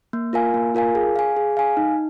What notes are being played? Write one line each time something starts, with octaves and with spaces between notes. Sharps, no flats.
A#3
F4 A#4 F5 G#5
A#3
F4 A#4 F5 G#5
G#4
F5 G#5
G#4
F5 G#5
D#4